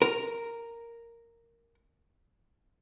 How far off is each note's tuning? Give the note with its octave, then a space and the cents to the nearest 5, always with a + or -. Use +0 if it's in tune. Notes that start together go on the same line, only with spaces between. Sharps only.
A#4 -5